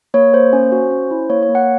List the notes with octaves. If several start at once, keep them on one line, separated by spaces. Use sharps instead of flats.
A#3 C#5
A#3 C5
C#4
F#4
C#4
E4
A#3 C#5
C#5
A#3
F#5